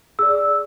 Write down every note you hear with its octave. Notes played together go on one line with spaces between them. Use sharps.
G#4 D5 E6